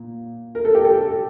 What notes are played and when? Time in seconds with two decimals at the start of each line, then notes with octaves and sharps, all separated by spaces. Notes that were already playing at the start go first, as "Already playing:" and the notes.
Already playing: A#2
0.55 A#4
0.65 A4
0.75 G4
0.85 A4